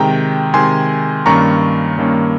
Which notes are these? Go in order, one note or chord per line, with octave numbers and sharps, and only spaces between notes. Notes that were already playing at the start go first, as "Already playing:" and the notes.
Already playing: C3 D#3 G#3 G5 A#5
C3 D#3 G#3 G#5 C6
G2 D#3 A#3 C#4 A#5 C#6
G2 D#3 A#3 C#4